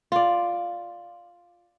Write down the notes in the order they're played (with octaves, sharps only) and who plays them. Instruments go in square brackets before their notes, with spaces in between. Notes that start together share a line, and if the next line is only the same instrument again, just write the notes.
[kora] F4 D5